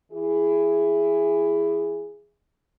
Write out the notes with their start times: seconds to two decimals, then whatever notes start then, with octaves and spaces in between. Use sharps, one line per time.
0.12 E3 E4 G#4